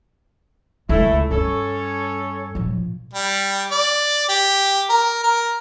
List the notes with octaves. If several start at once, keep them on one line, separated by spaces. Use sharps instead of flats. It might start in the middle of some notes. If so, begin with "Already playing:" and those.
C#2 C3 A3 E4
G2 C#4 A4 C#5
A#1 F3
G3
D5
G4
A#4
A#4